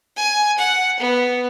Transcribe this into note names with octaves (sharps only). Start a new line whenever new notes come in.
G#5
F#5
B3